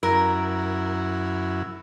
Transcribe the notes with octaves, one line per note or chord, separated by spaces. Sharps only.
F#2 E4 A#4